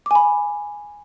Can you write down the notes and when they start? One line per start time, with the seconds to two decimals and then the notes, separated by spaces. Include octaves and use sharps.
0.06 D6
0.11 G#5
0.15 B5